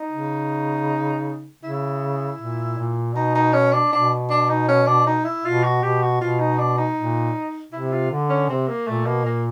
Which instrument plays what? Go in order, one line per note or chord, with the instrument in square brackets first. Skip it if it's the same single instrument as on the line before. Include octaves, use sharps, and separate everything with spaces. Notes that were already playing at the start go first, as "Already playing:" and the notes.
Already playing: [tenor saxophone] D#4
[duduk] C#3
[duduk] C#3 [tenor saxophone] E4
[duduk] A#2
A#2
[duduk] B2 [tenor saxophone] D#4
[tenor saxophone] D#4
C#4
D4
[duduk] B2 [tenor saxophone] D4
[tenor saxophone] D4
D#4
C#4
D4
D#4
E4
[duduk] B2 [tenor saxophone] F4
[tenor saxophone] F#4
[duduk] B2 [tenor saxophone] G4
[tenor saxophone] F#4
[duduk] B2 [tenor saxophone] F4
[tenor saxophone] D#4
D4
D#4
[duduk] A#2
[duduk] C3 [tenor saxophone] E4
[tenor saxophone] F4
[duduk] D3
[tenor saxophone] C#4
[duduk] C3 [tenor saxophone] C4
[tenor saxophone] A#3
[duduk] A#2 [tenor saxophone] A3
[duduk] B2 [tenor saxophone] A#3
[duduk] A#2 [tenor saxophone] A#3